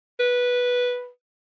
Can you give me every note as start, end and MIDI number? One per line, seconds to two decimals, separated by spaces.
0.20 1.09 71